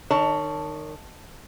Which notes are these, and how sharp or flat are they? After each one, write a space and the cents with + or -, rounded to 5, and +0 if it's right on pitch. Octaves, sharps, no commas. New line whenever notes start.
D#3 -25 C#5 +20 A5 +0